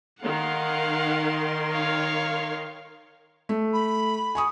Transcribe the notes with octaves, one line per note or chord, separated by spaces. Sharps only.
D#3 A#4 F5 F#5 C6
C#5 F5
A3
B5
G#5 C#6 D#6